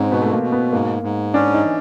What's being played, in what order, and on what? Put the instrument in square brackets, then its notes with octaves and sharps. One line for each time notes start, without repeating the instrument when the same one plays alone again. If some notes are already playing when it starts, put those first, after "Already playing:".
Already playing: [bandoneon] G#2 [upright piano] C4 C#4
[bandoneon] B2 [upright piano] B3
[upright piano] A3
A#3
[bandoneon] B2
[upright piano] B3
[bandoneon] G#2 [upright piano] A#3
[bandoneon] G#2
[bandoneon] C#4 [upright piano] D4
[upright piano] D#4
[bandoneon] E3